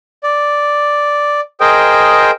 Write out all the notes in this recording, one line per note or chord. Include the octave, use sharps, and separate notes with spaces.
D5
G#4 A#4 C5 D#5 G5